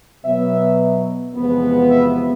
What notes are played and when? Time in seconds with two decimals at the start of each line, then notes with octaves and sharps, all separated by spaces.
0.25 B2 F#3 B3 E5
1.35 E2 C3 F3 G#3 B3
1.90 E5